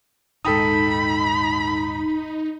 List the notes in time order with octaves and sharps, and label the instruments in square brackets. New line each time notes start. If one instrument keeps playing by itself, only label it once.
[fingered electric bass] D#1 G#2 [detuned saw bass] D#4 [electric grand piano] A4 G5 D#6 [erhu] B5